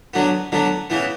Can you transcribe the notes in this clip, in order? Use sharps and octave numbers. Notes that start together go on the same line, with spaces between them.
D3 F#3 B3
D3 F#3 B3
C#3 E3 B3